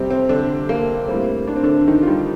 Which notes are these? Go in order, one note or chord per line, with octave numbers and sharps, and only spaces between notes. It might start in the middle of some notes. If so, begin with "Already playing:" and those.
Already playing: F2 C3 G3 C4 G4
C4
D3 D4
A#3
A2 G3 A#3 C4
D4
C4
D3 D4
D#3 D#4
F4
G3 G4